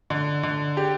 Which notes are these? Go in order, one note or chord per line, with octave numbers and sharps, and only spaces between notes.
D3
D3
G4